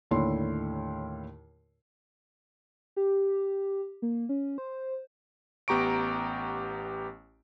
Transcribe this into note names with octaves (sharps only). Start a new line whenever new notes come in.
D#2 A2 D3 E4 C#5 C6
G4
A#3
C#4
C5
A1 B3 G4 A#5 C#6 D7